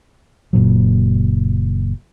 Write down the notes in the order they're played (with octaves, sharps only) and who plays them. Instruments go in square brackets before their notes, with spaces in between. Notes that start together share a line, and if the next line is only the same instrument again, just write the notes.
[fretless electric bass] F#1 A#2 F#3